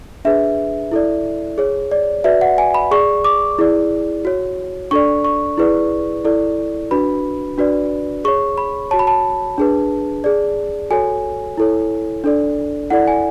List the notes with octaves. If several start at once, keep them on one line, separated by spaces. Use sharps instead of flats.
D4 G#4 B4 E5
E4 A4 D5
G#4 C#5
D5
F#4 B4 D5 E5
F#5
G#5
B5
G#4 D5 C#6
D6
E4 G#4 D5
F#4 C#5
D4 A4 D5 C#6
C#6
E4 G#4 B4 D5
E4 A4 D5
D4 F#4 B4 B5
D4 F#4 B4 D5
G#4 C#5 C#6
B5
F#4 C#5 A5
B5
A5
D4 G#4 B4
G#4 D5
F#4 A4 C#5 G#5
E4 A4 C#5
D4 A4 D5
E4 A4 D5 F#5
G#5